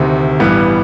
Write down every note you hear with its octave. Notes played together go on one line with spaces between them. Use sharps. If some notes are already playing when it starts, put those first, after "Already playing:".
Already playing: D2 C3 D#3
A1 G2 E3 G3 B3